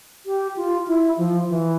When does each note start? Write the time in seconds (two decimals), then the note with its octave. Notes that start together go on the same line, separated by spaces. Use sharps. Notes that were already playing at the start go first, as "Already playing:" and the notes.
0.26 G4
0.57 F4
0.88 E4
1.18 F3
1.49 E3